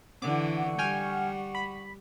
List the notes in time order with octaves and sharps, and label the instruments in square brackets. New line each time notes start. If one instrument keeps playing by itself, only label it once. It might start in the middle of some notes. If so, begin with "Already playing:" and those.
[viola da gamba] D3 E3 [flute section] F#5 C#6 [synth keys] D6
[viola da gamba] G3 [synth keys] G5 G#5 F6
[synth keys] B5